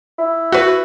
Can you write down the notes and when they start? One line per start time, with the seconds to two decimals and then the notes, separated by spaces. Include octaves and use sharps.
0.19 E4
0.52 F#4 B4